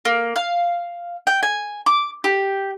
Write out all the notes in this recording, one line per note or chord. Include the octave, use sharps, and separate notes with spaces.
A#3
F5
G5
G#5
D6
G4